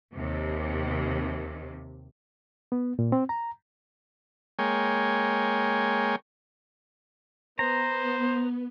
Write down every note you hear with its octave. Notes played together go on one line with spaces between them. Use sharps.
D#2 C3
B3
A#2
C4
A#5
G#3 A#3 C#5 G5 G#5
B3 C5 A#5